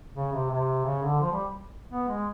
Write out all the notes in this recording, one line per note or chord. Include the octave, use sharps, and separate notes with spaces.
C#3
C3
C3
C#3
D3
F3
G3
B3
G#3